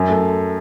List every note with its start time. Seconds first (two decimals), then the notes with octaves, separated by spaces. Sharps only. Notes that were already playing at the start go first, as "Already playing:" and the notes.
Already playing: F#2
0.09 A3